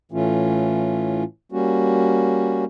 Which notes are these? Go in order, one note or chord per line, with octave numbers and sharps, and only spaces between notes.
A2 E3 A3 C#4 F4
G3 A#3 C#4 F#4